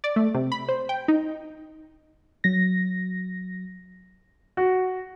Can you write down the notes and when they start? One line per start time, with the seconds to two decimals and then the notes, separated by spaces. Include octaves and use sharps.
0.04 D5
0.16 A3
0.35 C3
0.52 B5
0.69 C5
0.89 G5
1.08 D#4
2.44 F#3 A#6
4.57 F#4